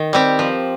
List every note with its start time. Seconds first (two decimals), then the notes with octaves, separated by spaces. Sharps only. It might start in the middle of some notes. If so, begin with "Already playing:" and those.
Already playing: D#3
0.13 G3 C4 G4
0.39 F3